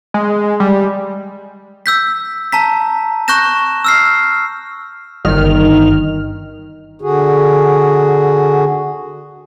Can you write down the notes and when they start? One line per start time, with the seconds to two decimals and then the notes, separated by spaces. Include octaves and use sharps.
0.14 G#3
0.60 G3
1.86 E6 G6 B6
2.52 A5 A#5 B6
3.28 C#6 F#6 G6 A#6 E7
3.85 E6 F6 C7
5.25 G1 D#3 F6
7.02 D3 F#4 G#4